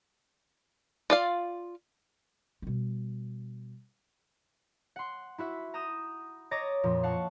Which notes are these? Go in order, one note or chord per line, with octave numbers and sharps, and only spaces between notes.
F4 D5 F5
B2 G3
F#5 C6
E4 F#4 E5
A#5 D#6 G6 D#7 E7
C#5 D#5 A#5 D6 A6 A#6
F2 A#2 F3
F5 F#5 A5 C#6